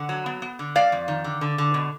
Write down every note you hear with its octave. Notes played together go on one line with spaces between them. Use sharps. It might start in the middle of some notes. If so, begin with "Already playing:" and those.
Already playing: D3 F#5
F#3
B3
B3
D3
G#3 D5 F5
F2
D#3
D3
D3
D3
B2